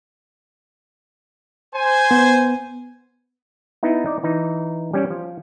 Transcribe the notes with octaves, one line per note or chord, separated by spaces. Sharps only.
C5 G#5
B3
B3 D#4 E4
D#4 D5
E3 D#4
G3 C#4 G4
F3